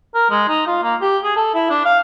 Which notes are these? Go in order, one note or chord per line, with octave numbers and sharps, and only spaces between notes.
A#4
G#3
D#4
F4
A#3
G4
G#4
A4
E4
D4
F5